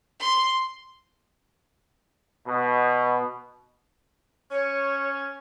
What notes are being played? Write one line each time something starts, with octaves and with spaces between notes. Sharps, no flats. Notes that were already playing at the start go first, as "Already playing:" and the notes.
C6
B2
C#4 C#5